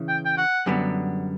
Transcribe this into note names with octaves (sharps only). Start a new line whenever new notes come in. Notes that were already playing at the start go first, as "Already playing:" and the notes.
Already playing: C#3 E3
G5
G5
F#5
F#2 D3 G3 B3